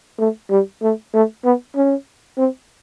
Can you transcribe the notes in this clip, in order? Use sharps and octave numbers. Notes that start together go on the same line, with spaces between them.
A3
G3
A3
A3
B3
C#4
C4